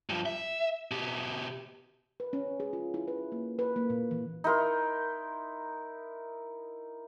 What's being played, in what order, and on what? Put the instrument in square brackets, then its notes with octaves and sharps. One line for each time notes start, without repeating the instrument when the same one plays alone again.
[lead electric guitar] G2 F3
E5
B2 G4
[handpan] B4
C#4
G#4
F4
E4
B4
A#3
B4
A#3
A#2
E3
[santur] D#4 E4 A#4 C6